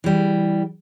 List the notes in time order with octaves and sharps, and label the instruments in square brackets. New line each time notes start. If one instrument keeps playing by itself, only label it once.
[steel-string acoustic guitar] E3 G3